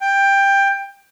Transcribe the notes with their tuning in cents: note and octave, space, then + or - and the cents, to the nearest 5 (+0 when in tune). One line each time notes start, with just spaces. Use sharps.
G5 +15